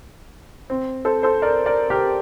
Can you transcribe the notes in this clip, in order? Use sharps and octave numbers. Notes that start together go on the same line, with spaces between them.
C4
A4 C5
A4 C5
A#4 D5
A#4 D5
G4 A#4